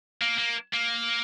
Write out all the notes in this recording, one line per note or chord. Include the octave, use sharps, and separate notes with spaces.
A#3
A#3
A#3